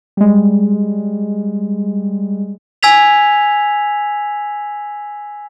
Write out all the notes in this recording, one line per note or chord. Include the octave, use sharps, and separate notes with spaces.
G3 G#3
G#5 E6 G#6 B6 F7